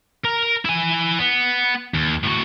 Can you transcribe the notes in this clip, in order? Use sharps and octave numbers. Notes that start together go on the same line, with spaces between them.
A#4
E4 G#5
B3
D#2
A2 F#4